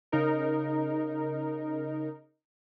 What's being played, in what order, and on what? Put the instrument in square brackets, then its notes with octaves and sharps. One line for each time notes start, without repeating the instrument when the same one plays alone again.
[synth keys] C#3 D#4 A#4